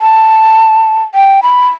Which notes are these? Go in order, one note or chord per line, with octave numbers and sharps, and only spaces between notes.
A5
G5
B5